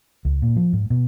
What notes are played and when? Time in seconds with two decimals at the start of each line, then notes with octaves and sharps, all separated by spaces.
0.25 C#2
0.42 A#2
0.56 F3
0.73 G#2
0.90 B2